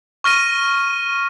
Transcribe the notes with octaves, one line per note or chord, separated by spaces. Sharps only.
C#6 F6 A#6 D#7